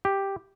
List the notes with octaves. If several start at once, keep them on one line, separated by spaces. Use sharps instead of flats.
G4